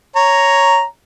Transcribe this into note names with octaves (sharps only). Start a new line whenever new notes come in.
C#5 A#5